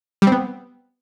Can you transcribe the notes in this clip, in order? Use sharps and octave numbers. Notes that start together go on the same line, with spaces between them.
G3
C4
B3